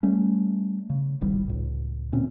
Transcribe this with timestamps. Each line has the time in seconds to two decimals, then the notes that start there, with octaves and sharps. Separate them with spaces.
0.03 G3 A3 C#4
0.90 C#3
1.21 D1 G#1 G3
1.48 C#2 A2
2.12 D2 A#2 C4 C#4